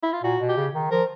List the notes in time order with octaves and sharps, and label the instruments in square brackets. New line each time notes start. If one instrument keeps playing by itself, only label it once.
[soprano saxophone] E4
F4
[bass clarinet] A#2 [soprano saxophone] F#4
[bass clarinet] B2
[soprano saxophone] G4
[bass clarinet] C#3
D#3
[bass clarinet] F3 [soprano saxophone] A#4